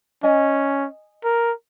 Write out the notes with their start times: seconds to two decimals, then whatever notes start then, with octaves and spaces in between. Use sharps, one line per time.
0.23 C#4 D#5 G#5
1.24 A#4